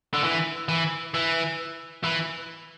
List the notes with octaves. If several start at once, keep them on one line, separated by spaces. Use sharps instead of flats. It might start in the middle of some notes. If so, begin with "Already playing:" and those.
D3
E3
E3
E3
E3